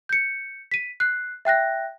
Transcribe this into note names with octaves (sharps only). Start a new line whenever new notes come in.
G6 C#7
B6 D#7
F#6 C7
E5 G5 F#6 A#6